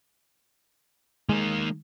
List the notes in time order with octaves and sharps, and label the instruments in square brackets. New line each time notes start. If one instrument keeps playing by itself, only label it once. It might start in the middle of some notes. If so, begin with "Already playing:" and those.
[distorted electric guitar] D#3 A#3 [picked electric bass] G#3